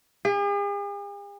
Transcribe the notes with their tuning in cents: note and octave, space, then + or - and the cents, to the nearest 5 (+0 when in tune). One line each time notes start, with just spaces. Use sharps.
G#4 -45